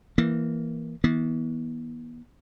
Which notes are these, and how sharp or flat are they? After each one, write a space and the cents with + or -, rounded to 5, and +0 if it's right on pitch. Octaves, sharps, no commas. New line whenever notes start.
E3 +0 A#3 +0
E3 -40 B3 -40